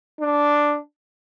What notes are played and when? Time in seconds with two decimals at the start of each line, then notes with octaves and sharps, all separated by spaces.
0.20 D4